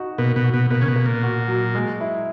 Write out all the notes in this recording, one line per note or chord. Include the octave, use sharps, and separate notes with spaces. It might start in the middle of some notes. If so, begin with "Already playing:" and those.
Already playing: D#4 F#4
B2 A#3
B2
F#4
B2
B2 A#3
C#3
B2
A#3
A#2
F#4
F#3
G#3
E4